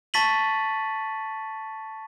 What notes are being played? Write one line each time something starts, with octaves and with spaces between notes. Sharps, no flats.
A5 C#6 A6 B6 D#7 F#7